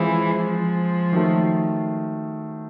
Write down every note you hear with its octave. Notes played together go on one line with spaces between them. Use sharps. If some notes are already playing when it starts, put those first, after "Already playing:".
Already playing: E3 G#3 C4 F4 G#4 C5
F3
D#3 F#3 A3